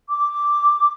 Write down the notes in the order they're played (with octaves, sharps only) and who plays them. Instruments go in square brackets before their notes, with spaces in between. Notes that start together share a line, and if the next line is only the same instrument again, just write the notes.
[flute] D6